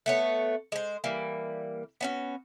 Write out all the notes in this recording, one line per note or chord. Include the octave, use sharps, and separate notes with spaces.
A3 B3 C#5
G#3 C5
E3 G3 A#3
B3 C#4 F#4